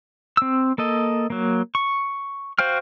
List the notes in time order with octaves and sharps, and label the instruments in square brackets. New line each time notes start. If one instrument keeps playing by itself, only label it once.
[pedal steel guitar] C4 E6
A#3 A4 D#5
F#3 A#3
C#6
F#4 C5 F5 G5 F6